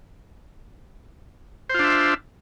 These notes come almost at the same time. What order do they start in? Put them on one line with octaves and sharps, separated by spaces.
C5 F4 D4 E5